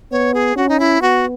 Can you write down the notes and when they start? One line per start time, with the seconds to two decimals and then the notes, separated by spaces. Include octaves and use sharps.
0.11 B3 C#5
0.34 G#4
0.56 C#4 F#4
0.69 D#4
0.79 E4
1.01 B3 F#4